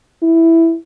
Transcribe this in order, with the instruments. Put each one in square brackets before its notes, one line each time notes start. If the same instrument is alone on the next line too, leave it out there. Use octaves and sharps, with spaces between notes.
[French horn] E4